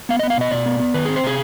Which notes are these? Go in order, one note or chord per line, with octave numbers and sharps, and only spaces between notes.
B3 F5
B3 D#5
F5
B2 D#5
B2 D5
B3
B3
D#3 B4
C4 G#4
C5
C3 G#4